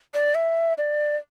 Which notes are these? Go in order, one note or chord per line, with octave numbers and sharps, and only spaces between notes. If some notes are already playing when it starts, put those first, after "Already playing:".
D5
E5
D5